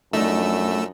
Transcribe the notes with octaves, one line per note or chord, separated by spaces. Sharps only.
F#2 F3 A3 D4 D#4 E6